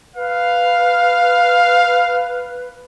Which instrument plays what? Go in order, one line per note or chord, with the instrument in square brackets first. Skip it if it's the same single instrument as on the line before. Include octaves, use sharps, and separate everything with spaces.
[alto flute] B4 [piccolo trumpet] F5